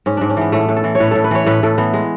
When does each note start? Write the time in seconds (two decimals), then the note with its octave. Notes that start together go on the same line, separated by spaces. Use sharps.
0.06 G#2 C#4
0.17 G#2 D4
0.29 C#4
0.37 E3 B3
0.52 A2 A3
0.69 A2
0.77 A4
0.84 E3
0.95 C#5
1.00 A2 B4
1.11 A2 A4
1.24 B4
1.31 E3 C#5
1.46 A2 B4
1.63 A2 A4
1.78 E3 B3
1.94 G#3